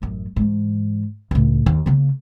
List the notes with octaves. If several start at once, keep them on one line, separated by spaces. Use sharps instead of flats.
A1 F#2
G#2 E3
C#2 A2
D#2
C#3 A#3